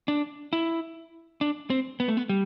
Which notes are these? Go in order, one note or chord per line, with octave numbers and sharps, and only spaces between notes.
D4
E4
D4
C4
B3
A3
B3
G3